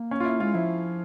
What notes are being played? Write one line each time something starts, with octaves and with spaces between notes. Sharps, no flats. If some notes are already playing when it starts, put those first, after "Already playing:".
Already playing: A#3
C#4
F4
E4
G#3 F4
F3 E4